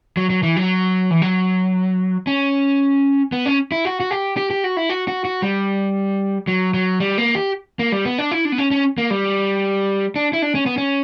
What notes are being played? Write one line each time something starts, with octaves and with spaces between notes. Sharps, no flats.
F#3
F#3
E3
F#3
E3
F#3
C#4
B3
C#4
E4
F#4
F#4
G4
G4
G4
F#4
E4
F#4
F#4
F#4
G3
F#3
F#3
G3
A#3
G4
A#3
G3
B3
D4
E4
D4
B3
C#4
C#4
A#3
G3
D4
E4
D4
C#4
B3
C#4